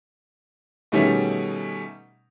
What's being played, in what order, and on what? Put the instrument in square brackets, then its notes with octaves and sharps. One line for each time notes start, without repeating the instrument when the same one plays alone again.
[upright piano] B2 D#3 G3 A3 C#4 G#4